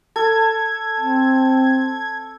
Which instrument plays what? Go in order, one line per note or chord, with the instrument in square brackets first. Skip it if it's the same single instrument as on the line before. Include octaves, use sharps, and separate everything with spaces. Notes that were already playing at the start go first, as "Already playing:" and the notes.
[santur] A4 [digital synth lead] G#6
[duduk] C4